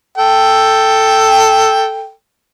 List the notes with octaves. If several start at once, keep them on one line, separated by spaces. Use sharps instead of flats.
A4 G5